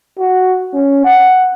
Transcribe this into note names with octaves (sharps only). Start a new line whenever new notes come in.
F#4
C#4
F#5